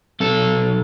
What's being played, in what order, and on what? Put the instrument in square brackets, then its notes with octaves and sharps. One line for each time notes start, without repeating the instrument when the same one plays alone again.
[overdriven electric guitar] B1 A4